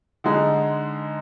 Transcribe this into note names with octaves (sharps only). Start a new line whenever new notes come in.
D3 G#3 D#4